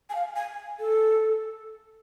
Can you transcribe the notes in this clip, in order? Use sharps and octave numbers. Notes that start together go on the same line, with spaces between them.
G#5
F5
G#5
A4